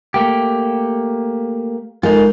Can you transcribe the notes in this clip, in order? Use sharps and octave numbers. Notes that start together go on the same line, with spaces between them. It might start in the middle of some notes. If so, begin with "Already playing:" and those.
A3 A#3 G4
G#3 D#4 F4 A#4